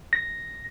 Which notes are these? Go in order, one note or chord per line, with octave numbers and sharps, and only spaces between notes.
A#6